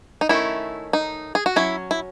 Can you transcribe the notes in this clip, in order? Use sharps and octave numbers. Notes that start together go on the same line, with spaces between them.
D#4
D#3 A3 C#4 E4
D#4
G#4
F#4
F#3 C#4 E4
E4